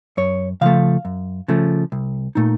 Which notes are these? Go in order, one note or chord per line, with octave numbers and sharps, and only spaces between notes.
F#2 C#5
C#3 F3 A3 F5
F#2
C#3 F3 A3
C2
A#2 A3 D#4